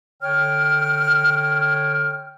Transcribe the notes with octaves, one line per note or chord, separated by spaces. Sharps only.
D3 C#5 G5 F6